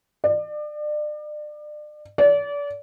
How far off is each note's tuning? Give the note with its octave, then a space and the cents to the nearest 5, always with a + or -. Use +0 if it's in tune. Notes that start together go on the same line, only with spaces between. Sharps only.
D5 +35
D5 -30